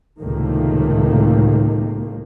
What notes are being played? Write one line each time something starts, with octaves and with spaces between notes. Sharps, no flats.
C#2 A2 C3 D#3 A3 A#3